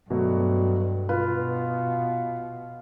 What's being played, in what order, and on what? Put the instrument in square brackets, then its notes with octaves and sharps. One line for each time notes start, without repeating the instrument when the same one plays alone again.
[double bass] G2 [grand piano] B2 F#3 A3
[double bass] B2 [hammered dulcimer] F4 [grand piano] B4